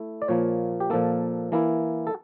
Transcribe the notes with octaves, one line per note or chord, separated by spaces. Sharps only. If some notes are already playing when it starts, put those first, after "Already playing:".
Already playing: A3 E4
D5
A#2 F3 A#3 C#5
G4
A#2 F3 A#3 A4
E3 A#3 E4
A4